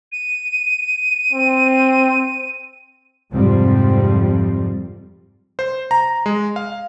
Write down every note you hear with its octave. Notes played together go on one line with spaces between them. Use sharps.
D#7
C4
F2 G#2 C3 F3 G3 C4
C5
A#5
G#3
F5